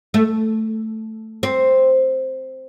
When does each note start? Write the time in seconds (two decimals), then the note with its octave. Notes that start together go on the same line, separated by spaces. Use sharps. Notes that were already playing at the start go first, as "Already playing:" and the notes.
0.14 A3
1.43 C4